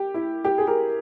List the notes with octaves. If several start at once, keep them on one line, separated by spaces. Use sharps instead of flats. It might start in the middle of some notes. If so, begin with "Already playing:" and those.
Already playing: G4
E4
G4
G#4
G4 A#4